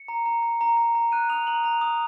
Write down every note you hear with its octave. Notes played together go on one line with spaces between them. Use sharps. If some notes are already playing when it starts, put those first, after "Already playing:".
Already playing: C#7
A#5
A#5
A#5
A#5
A#5
A#5
F#6 D#7
D#6 F7
A#5 F#7
A#5 F7
D#6